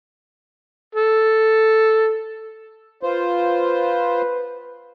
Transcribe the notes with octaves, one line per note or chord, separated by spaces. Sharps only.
A4
F4 B4 C5